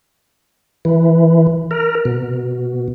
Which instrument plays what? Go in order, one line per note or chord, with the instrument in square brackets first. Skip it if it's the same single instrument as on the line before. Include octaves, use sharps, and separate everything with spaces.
[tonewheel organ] E3
A#4
B2